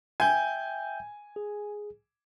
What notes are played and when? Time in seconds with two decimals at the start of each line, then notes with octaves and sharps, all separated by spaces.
0.20 E5 G5 G#5 G6
1.36 G#4